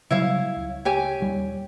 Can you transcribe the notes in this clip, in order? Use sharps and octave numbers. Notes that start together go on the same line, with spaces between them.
C#3 F#3 G3 E4 C#5 F5
C#2
G4 C#5 G#5
D#1 G3